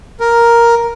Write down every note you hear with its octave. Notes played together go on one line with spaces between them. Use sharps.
A#4